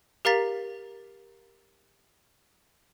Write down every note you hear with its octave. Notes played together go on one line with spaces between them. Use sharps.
G4 A#4 F5 A#5 A6 B6